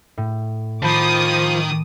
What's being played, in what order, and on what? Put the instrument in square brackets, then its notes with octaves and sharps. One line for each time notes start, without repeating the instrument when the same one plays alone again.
[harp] A2
[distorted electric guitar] D#3 [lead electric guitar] F3 [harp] A5 B5 G6 [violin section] D6 D#6